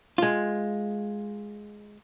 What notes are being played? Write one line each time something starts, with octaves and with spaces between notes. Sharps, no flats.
G#3 F4